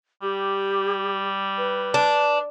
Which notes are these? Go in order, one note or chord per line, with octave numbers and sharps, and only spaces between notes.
G3 G4
B4
D4